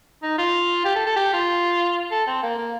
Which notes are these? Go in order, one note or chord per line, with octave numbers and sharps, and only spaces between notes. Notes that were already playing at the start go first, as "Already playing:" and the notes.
D#4
F4
G4
A4
A4
G4
F4
A4
C4
A#3
A#3